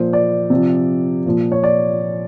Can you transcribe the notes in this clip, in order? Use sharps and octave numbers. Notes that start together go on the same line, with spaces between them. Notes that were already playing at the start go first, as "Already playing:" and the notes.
Already playing: A#2 F3 C5
D5
C3 F3
A#2 F3
C#5
D5